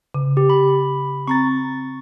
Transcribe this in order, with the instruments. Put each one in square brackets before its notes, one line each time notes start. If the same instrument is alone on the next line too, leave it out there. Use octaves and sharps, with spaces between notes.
[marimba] C#3
[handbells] G4
B5
[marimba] C4 A#5 [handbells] C#6 A6